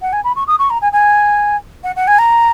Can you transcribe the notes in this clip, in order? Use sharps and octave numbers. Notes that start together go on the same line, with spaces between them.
F#5
G#5
B5
C#6
D#6
C#6
A#5
G#5
G#5
F#5
F#5
G#5
A#5